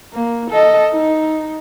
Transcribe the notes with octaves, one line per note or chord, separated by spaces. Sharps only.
A#3
A4 D#5
D#4